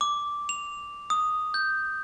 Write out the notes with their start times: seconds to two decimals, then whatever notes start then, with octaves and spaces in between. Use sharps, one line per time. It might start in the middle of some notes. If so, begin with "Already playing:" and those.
0.01 D6
0.49 F7
1.10 D#6
1.54 G6